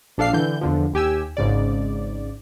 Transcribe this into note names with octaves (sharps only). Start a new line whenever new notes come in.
A#1 D4 A4 F5 C7
D3 E3 G6
E2 D3 F3
D#2 G4 G#5 E6
G#1 G#2 C#3 D5